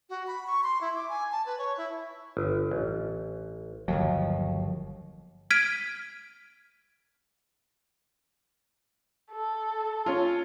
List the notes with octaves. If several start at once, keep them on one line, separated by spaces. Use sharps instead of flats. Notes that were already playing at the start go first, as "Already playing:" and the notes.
F#4
B5
C#6
C6
E4
D6
G#5
A5
B4
C#5
E4
G1
A1
G1 D#2 F3 F#3
F6 G#6 B6 D7 D#7
A4
C#4 F4